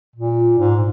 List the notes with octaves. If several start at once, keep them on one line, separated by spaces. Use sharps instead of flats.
A#2
G#2